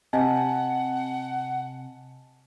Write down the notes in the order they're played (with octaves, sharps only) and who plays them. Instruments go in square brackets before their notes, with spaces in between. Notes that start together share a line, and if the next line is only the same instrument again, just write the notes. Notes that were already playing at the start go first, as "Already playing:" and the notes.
[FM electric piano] C3 [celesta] D#5 G#5 A5 [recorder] F#5